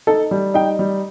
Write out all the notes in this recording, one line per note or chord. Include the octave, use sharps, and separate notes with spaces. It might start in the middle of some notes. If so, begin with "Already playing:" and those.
D#4 A4
G3
D#4 G5
G3